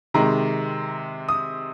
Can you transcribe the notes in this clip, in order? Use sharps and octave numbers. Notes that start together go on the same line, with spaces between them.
C3 D#3 G#3 A#5
D#6